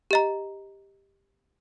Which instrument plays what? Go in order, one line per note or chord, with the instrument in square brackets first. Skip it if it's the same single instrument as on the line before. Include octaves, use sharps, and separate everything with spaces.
[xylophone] G4 D#5 A#5